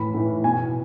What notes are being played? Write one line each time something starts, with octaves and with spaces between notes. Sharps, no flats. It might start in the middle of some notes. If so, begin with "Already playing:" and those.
Already playing: A2 E3 B5
A2 E3
B2 G#5